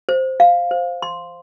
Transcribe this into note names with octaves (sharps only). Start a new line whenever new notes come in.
C5
F5
C5
C6